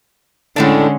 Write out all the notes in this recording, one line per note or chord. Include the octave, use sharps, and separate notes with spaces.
A2 D3 G#3 A3 C#4 D4